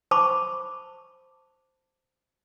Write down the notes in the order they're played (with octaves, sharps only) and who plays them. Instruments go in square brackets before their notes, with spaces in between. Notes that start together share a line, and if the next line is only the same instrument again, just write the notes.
[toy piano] C5 A5 B5 C#6 D6